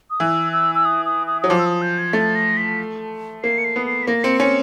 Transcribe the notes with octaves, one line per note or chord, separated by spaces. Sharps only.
D#6
E3 E6
E6
E6
D#6
D#6
D#6
F#3 D#6
F3 D6
E6
D#6
G6
G#6
A3 A6
A#6
B6
A#3 C7
C#7
C7
B3
C7
B6
A#3 A#6
C4 C#7
C#4 C#7